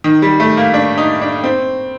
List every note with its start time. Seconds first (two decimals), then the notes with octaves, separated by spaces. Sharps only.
0.04 D#3
0.22 G3
0.40 A3
0.57 A#3
0.74 D4
0.98 D#4
1.22 D4
1.44 C4